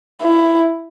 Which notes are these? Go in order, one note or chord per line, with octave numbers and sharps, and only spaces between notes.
E4